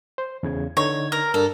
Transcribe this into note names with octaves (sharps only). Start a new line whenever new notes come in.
C5
E2 C#3 G#6
D3 D#4 C#5
A#4
G2 D4 A4 A#4